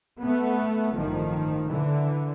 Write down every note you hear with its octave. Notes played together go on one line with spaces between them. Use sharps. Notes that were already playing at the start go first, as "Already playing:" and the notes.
A3 B3
A1 G2 D#3 F3
D3 E3